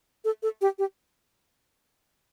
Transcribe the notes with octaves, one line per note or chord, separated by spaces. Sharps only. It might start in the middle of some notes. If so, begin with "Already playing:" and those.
A4
A4
G4
G4